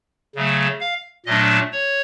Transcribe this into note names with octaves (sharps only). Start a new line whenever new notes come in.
C#3 F#3 A3
F5
A#2 F#3 A3 D4 D#5
C#5